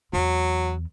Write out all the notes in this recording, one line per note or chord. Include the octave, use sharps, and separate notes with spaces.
E2 F#3